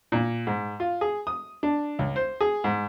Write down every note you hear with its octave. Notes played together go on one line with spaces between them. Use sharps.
A#2
G#2
F4
G#4
D#6
D4
C#2
C5
G#4
G#2